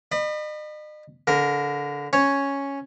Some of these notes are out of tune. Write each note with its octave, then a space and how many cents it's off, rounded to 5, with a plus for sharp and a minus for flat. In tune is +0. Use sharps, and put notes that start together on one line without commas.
D#5 -40 B5 +0
D3 -25 A#4 +0
C#4 +0 C#5 +0